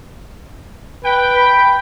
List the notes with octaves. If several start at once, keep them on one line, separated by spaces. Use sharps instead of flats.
B4 G5
B5